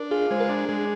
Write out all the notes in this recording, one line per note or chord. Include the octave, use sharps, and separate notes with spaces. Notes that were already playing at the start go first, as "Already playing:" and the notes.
Already playing: D4 A#4
F4 G#4
G#3 C5
A#4
D4
G#3